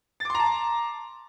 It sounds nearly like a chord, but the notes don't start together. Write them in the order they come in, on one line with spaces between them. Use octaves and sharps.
A6 D6 C6 A#5 A5